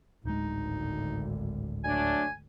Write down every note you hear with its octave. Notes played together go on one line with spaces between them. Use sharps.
D1 G#1 D2 G#3 D#4
F#3 A3 D4 G#5